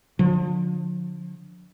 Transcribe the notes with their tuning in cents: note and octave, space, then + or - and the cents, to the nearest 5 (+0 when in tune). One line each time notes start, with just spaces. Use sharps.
D3 +0 F3 +35